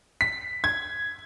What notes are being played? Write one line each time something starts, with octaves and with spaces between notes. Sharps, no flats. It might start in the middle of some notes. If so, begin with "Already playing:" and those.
B6
G#6